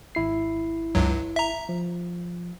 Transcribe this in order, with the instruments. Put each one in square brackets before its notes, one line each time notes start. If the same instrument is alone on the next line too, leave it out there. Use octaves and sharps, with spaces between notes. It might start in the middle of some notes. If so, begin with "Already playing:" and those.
[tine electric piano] G#1 E4 C7
[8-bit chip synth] C#2 G2 F#3
E5 A#5
[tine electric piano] F3